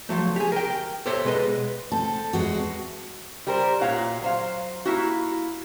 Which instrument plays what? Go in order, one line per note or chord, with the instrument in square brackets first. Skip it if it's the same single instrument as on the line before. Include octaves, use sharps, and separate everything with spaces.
[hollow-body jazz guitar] F3 F#3 A3
G4 G#4
A#4 G5
G4 A4 C5 C#5 E5
B2 G#3 B4 D#5
[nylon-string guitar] C4 A5 [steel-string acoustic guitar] A4
[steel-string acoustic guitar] E2 G#3 F#4
[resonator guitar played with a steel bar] G3 A#4 C5
A#2 F#4 C#5 F5 F#5
F#3 C5 F5
A#3 E4 F#4